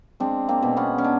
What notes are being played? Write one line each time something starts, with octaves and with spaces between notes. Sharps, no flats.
G#3 C4 D4
A#3 C4
B2
B3 C#4
C#4
D4